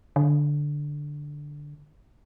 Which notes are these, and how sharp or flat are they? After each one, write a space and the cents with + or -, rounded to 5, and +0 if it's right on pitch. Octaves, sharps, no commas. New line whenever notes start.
D3 +0